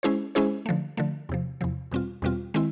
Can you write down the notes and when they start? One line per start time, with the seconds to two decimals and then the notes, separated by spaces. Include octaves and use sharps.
0.03 G#3 C#4 E4 G#4 C5
0.35 G#3 C#4 E4 G#4 C5
0.66 D3 F3 A3
0.97 D3 F3 A3
1.29 E2 C3 F3
1.61 E2 C3 F3
1.91 E2 B2 G3 C4 F4
2.22 E2 B2 G3 C4 F4
2.54 D#3 G#3 C4 E4